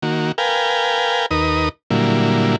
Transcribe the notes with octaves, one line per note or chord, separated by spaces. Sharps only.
D#3 A#3 F#4
A#4 B4 F5 G5 G#5
D#2 D#4 A#4 B4 D#6
A#2 D3 F#3 G3 A#3 E4